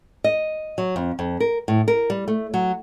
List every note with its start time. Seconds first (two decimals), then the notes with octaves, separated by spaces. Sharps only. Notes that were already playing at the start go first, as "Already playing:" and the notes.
0.24 D#5
0.78 F#3
0.96 F2
1.19 F2
1.40 A#4
1.68 A2
1.88 A#4
2.10 G3
2.28 A3
2.54 F#3